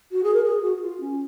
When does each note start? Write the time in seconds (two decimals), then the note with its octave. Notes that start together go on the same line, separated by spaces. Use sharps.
0.12 F#4
0.23 G#4
0.34 A#4
0.43 G#4
0.62 F#4
0.76 F#4
0.82 F4
1.00 C#4